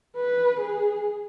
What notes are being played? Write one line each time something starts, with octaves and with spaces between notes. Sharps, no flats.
B4
G#4